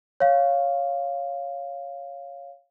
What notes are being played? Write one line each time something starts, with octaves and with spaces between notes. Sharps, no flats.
C#5 F5